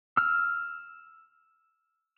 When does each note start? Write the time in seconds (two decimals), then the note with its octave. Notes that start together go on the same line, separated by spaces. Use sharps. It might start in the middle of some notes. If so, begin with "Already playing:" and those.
0.17 E6 F6